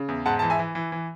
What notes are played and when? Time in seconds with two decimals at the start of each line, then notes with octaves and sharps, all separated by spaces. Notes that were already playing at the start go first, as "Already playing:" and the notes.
Already playing: C#3
0.08 E2
0.26 G#2 F#5 A5
0.39 E3 A5
0.50 E5 G#5
0.59 E3
0.75 E3
0.92 E3